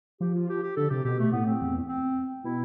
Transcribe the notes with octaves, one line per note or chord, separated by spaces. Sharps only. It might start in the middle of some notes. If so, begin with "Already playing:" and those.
F3 G4
F4
G4
G4
D3 A4
C3 G4
B2 G4
A3
A2 B3
C4
E2
C4
B2 E4